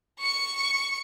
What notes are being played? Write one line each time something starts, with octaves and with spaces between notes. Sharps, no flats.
C#6 C#7